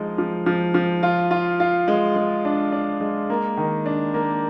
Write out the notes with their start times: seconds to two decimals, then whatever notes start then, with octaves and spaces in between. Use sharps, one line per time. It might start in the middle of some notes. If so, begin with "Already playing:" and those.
Already playing: F3 G#3 D#4
0.18 F3
0.46 F3
0.74 F3
1.03 F4
1.31 F4
1.60 F4
1.88 G#3
2.16 G#3
2.45 D4
2.72 D4
3.00 G#3
3.30 A#3
3.57 D#3
3.86 D4
4.14 A#3